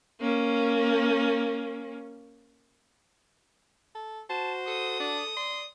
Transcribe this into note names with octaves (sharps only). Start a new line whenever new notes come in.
A#3 C#4
A4
F#4 C5 A5
A4 D#6
D4
D5 C6